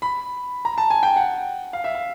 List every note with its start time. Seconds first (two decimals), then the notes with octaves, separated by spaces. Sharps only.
0.02 B5
0.65 A#5
0.78 A5
0.90 G#5
1.03 G5
1.16 F#5
1.73 F5
1.84 E5
1.95 F5